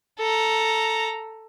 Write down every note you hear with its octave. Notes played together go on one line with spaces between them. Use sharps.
A4 A#5